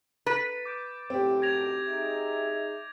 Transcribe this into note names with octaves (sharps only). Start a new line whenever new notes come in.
B4 A6
D6 G6 D7
B1 F#2 A2 C4 G4
G#6 A#6 F7
D#4 G#4 E5